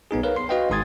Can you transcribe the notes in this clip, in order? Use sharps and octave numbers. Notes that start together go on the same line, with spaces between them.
B1 B3 D#4 G#4
A#4 B4 C#5 F5
C6 C7
F#4 B4 D#5 F5 G5
G#1 G#2 C6 D#6 G#6 A6